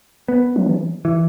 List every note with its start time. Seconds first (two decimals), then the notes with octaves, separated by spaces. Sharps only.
0.28 B3
0.56 F#3
0.66 E3
1.05 E3